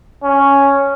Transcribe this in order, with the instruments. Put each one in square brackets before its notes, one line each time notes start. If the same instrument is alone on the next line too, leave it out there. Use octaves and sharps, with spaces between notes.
[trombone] C#4